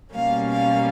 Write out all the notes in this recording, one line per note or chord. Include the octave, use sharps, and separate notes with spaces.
B2 G3 A#3 C#4 F5
F5